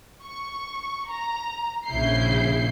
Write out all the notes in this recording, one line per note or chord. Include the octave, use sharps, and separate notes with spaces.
C#6
A#5
A#1 C#3 E4 G6 C7